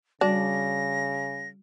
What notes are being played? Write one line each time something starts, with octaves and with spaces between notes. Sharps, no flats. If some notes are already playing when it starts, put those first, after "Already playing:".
C#3 G3 D4 F#4 A#6